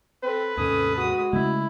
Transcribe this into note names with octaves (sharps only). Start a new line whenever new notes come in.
C4 A4 B4
D#2 G#2 C3 C#4 A4 D#6
G#3 F#4 D#6
C#3 G#3 A3 E4